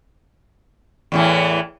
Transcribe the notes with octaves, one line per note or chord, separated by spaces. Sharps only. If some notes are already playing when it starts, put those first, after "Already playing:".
E2 A2 E3